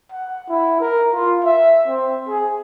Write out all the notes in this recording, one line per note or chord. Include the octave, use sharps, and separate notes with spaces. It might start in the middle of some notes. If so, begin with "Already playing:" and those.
F#5
E4
A#4
F4
E5
C4
G#4